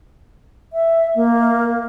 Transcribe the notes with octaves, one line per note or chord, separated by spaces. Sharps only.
E5
A#3